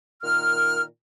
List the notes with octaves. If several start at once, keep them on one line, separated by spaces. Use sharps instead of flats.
A#2 D#3 F6